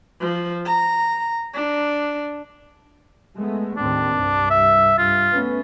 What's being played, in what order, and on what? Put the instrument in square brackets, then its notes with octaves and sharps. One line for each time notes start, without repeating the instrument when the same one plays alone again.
[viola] F3
A#5
D4
[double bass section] G#3 A3 B3
[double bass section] D#2 A2 C4 [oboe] D4
[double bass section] C2 G2
[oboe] E5
[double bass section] G2 [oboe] F4
[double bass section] A3 B3 C#4